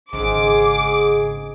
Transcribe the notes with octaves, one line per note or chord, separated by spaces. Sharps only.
G#1 G#2 C#3 G#4 D6